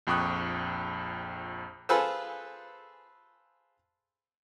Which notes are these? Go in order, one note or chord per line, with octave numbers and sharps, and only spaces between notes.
A#1 F2 G5 C#6 D#6 F#6
F4 G#4 A4 B4 C5 E6